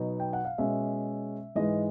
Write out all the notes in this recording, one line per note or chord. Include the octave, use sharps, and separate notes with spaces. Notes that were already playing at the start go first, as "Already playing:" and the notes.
Already playing: B2 F#3 B3 D#4
G5
F#5
F5
B2 G#3 C#4 E5
G#2 E3 G#3 D#5